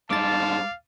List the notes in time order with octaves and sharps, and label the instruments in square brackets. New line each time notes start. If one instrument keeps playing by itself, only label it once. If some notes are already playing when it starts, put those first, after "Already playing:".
[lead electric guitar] G2 G#3 [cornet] F5 [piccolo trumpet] A5 [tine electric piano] D6 A6